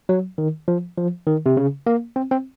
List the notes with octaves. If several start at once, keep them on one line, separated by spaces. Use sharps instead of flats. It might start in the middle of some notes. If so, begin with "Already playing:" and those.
F#3
D#3
F3
F3
D#3
C3
C#3
A#3
C4
C4